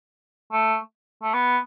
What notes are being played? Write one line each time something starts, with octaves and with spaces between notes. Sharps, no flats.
A3
A3
B3